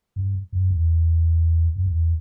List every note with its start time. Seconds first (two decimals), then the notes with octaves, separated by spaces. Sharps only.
0.16 G2
0.52 F#2
0.71 E2
1.76 F#2
1.86 E2